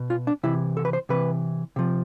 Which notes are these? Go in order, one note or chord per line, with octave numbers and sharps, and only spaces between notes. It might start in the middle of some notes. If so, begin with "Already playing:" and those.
Already playing: B2
F4
D4
C3 E3 E4
A4
B4
C5
C3 E3 B4
C3 F3